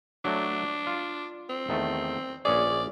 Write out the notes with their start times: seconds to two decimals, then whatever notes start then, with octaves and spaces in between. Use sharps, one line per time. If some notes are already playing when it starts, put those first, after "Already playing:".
0.25 F#3 A3 D4
0.87 F4
1.50 C4
1.69 E2 D#3 A3
2.45 A#1 C#4 G#4 D5